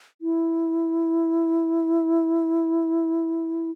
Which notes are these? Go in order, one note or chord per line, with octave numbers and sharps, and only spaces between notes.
E4